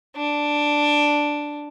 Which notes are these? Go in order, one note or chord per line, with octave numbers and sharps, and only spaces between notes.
D4